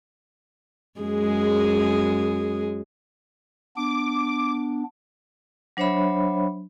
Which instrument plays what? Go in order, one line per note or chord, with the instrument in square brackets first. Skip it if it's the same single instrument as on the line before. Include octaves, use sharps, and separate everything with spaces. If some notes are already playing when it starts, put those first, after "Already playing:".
[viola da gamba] F#2 G#3 G#4
[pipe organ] B3 D4 [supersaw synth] D6
[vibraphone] F#3 D4 C5 C#5 E5 B5